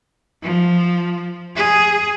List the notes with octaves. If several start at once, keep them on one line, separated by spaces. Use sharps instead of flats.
F3
G#4